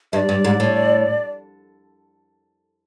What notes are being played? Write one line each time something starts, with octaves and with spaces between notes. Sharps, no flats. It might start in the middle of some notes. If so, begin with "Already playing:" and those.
G2 E5
D5
G2
G#2
A2